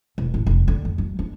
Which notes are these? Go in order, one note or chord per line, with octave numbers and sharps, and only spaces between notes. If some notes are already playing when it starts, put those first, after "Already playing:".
E1
A1
F1
D3
F2
F#3
D4